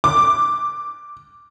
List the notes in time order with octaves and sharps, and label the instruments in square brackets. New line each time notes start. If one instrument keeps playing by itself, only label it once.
[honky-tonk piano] D6